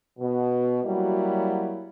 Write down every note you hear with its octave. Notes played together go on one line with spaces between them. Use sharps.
B2
F#3 G3 A#3 E4 F#4